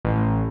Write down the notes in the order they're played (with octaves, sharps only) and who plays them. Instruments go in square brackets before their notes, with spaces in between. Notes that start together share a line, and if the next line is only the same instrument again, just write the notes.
[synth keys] A1